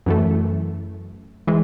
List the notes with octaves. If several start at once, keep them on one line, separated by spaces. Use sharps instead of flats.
F#2 E3 A3
E3 G#3